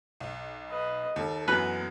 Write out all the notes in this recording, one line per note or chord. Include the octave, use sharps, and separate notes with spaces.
B1
B4 D#5
D#2 A4
F#2 E3 F#3 B3 B4